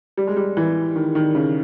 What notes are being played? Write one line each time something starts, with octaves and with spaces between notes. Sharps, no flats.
G3
G#3
G3
E3
D#3
D#3
C#3